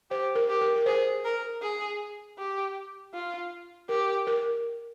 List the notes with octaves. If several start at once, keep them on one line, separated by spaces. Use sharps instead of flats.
G4 C5
A#4
G4
A#4
A#4
G#4 C5
A#4
G#4
G4
F4
G4 A#4
A#4